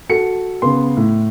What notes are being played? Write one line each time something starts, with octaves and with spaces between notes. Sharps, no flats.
F#4 A4 C#7
C#3 B3 C6
A2